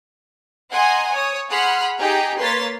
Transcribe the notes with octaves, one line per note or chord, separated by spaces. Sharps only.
D#5 F#5 G#5 A#5 C6
C#5 D#6
G#4 F#5 B5 C6 F6
D#4 G4 G#4 G5 A#5
A#3 B4 C#5 C6 A6 B6